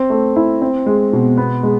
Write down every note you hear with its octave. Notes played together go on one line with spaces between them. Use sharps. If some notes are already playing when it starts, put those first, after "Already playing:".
Already playing: C4
A3
E4
C4
G#3
B2
B3
G#3